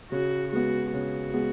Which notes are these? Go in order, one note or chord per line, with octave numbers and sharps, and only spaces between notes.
C#3 F#4
G#3 B3 F#4
C#3 F#4
G#3 B3